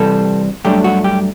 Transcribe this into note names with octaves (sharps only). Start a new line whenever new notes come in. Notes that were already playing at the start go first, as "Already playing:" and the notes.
Already playing: C3 E3 G3 C4 A4
G2 F#3 A3 D4 G4
F#4
G4